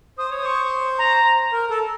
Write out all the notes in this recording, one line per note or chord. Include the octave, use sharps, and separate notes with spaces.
C5 D#6
C#5 D#6
C5 C#6
A#5
A#4
A4